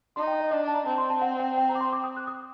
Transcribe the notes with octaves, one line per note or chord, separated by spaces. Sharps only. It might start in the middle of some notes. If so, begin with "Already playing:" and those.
D#4 C6
G5
D#5
D4 D#5
A5
A#5
C4 A5
C6
A5
F#5
G5
G5
A#5
D6
C6
D6
D#6
F#6
D#6